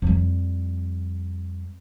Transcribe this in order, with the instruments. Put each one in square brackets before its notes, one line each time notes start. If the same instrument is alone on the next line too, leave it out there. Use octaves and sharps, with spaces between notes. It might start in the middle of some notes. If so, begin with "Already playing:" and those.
[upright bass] F2 G3